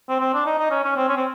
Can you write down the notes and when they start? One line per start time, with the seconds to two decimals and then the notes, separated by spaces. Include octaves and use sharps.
0.09 C4
0.20 C4
0.34 D4
0.46 D#4
0.59 D#4
0.71 C#4
0.84 C#4
0.96 C4
1.08 C#4
1.17 C4